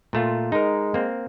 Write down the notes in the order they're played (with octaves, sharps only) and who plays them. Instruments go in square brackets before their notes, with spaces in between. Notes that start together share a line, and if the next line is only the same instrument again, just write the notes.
[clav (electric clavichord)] A#2 A3 F4
[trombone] G#3 [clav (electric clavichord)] D#4 A#4
[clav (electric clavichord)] A#3 C4